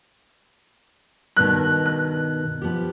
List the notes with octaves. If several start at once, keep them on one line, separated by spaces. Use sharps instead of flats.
G2 B2 D#3 F#6
F#6
F3 B3 G4